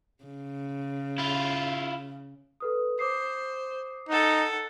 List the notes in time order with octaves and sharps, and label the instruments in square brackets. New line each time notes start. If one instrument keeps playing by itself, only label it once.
[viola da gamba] C#3
[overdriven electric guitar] E4 F4
[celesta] A4 B4 D#6
[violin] C5 [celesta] D6 D#6 C7
[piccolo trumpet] D#4 [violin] A4 F#5